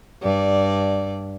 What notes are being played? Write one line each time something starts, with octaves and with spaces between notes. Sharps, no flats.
G2 D5